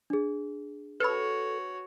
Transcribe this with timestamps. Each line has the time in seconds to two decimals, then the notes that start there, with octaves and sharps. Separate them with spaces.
0.10 D4 G#4
1.00 F#4 A4 B4 C#5 B5